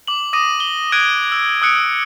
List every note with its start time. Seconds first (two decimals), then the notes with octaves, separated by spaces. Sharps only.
0.08 D6 F#7
0.33 D6 D#6 A#6 D#7
0.60 G7
0.92 D#6 F#6 G#6 D7 D#7
1.32 E6
1.62 D#6 E6 F#6 C#7 D7